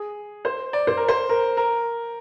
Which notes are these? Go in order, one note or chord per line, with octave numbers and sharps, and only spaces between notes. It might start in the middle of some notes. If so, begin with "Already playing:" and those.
Already playing: G#4
C5
D5
C5
A#4
C5
A#4
A#4